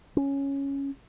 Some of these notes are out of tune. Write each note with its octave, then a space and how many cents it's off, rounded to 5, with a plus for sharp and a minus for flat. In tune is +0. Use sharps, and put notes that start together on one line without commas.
C#4 +0